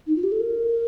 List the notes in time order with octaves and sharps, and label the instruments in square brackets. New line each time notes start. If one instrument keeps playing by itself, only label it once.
[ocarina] D#4
F4
G4
A4
A#4